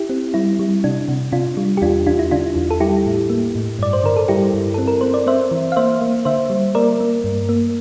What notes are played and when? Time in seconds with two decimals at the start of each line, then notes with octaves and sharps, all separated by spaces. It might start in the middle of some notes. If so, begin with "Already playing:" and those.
Already playing: E4 G4
0.09 C4
0.34 G3 E4
0.59 G3
0.84 C3 D4
1.08 C3
1.32 C3 D4 F4
1.57 G3
1.77 G4
1.82 E2 D4 F4
2.07 E2 D4 F4
2.19 E4
2.31 D3 D4 F4
2.56 E2
2.71 A4
2.80 G3 E4 G4
3.06 A2
3.30 A#3
3.55 A2
3.79 G2 D5
3.93 C5
4.04 D3 A#4
4.17 A4
4.28 G3 E4 G4
4.54 G2
4.74 C4 A4
4.88 A#4
5.01 C4 C5
5.14 D5
5.27 C4 C5 E5
5.51 E3
5.72 F5
5.76 A#3 C5 E5
6.01 A#3
6.25 D3 C5 E5
6.50 G3
6.75 A#3 A#4 D5
7.00 A#3
7.24 G2
7.49 A#3